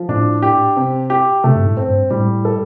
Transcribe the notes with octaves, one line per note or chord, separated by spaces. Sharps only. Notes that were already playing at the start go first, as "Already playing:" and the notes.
Already playing: F3
A2 D4
G4
C3
G4
C3 A3
G2
A2
C4
G2
A2 G3
A4